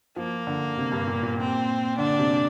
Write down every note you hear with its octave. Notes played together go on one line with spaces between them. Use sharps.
F3 A#3
D3
C3
G2
A#2
A#2
C4
D3 D4
C3